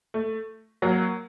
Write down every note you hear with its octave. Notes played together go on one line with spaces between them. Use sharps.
A3
F#3 A#3